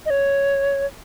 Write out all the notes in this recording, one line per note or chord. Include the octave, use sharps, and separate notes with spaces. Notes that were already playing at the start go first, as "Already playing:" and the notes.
D#5
C#5